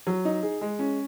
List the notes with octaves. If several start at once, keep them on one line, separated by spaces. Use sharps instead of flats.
F#3
D#4
G#4
G#3
C#4